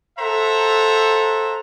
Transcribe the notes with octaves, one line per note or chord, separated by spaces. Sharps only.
A4 C5 E5 F#5 A#5